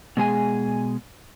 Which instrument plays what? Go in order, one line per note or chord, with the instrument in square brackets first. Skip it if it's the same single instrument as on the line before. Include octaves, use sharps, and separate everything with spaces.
[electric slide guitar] B2 G#3 G#4 G#5